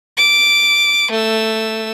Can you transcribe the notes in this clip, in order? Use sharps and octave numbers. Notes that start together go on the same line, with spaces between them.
D6
A3 E6